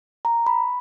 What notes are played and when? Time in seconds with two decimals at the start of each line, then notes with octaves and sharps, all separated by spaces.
0.25 A#5
0.47 B5